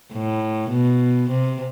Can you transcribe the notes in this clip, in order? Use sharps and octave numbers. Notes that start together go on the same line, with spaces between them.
A2
B2
C3